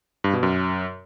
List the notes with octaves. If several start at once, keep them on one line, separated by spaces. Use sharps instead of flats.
G2
B2
F#2